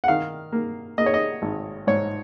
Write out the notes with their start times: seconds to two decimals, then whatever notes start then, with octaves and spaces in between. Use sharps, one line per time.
0.04 F#5
0.08 D#3 F5
0.52 A#3
0.98 A#3 D#5
1.06 C#5
1.14 D#5
1.42 G#1
1.87 G#2 C#5